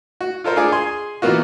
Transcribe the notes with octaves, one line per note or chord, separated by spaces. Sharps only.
F#4
F4 A4 A#4 C5
D4 F4 G#4 D6
G#4 G#5 C6
B2 E3 A#3 B3 F4 F#4